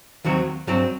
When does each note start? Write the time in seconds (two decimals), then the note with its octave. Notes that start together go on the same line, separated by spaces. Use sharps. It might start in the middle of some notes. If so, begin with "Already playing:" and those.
0.25 D#2 D#3 F#3 C4 F#4
0.67 G2 F#3 C4